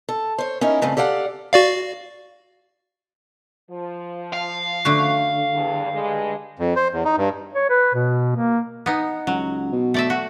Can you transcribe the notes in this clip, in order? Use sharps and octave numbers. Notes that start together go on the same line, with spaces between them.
A4
C5 C#5
C#4 D#4 E4 A#4
G2 C#3 A3 C4
G4 A4 D5 F5 F#5
F#4 D5 F5
F3
F5
D3 A3 F#4
E2 G2
G2 G#3
F2
C5
E2
D#4
G2
C#5
B4
B2
A#3
B3 D#4
C#2 F#3
B2
A3 D5 E5
F#4